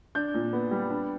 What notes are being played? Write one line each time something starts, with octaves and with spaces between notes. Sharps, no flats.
D4 G6
A#2
B3
G3
D4